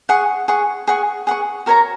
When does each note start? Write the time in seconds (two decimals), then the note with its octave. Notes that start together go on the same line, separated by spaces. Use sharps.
0.09 G#4 F#5 C#6
0.48 G#4 F#5 C#6
0.88 G#4 F#5 C#6
1.27 G#4 F#5 C#6
1.66 F#4 A#4 C#5 A#5